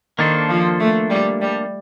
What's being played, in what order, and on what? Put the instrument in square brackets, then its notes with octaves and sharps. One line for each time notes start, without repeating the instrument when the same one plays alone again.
[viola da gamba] D#3 [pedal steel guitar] A#3 D4 A4 C5
[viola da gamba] F3
A3
G3
G3